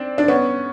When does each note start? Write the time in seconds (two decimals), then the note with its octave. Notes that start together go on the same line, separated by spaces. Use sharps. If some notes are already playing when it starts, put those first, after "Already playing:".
Already playing: C4 D4
0.18 D4
0.28 B3 C#4